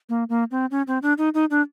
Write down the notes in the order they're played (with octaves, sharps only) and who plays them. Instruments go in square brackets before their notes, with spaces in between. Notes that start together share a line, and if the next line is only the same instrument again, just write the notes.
[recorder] A#3
A#3
C4
C#4
C4
D4
D#4
D#4
D4